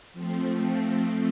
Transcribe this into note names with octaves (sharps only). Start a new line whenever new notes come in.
F3 A3 C4